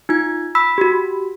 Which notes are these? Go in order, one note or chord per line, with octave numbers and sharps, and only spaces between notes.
D#4 F4 G#6
B5 E6 B6
F#4 G4